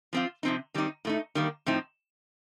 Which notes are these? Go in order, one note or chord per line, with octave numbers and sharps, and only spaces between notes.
F3 C4 F4
C3 F3 C4 D#4
D#3 G3 C4 D#4
A2 A3 D#4
D#3 G3 A#3
A2 F3 C4 D#4